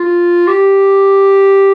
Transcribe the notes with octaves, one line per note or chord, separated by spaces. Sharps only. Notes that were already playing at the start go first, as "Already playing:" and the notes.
Already playing: F4
G4